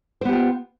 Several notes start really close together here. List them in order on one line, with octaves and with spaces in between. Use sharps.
C5 B3 G4 F4